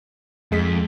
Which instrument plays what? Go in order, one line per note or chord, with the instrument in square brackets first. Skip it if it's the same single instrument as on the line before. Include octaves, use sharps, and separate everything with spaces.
[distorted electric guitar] F2 [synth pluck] G#3 G#4 B6